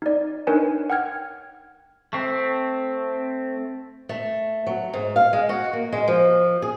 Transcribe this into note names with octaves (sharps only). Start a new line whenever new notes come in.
D#4 D5
D4 D#4 A#4 B4 C#5 G#5
F#5 G5 F6 G#6
A3 C4
A3
F#3
G#2
F5
G#3
F#4
A#3
G#3
F3
G#4